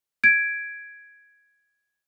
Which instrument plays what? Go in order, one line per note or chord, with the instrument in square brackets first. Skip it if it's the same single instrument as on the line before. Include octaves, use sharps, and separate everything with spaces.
[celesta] G#6 D7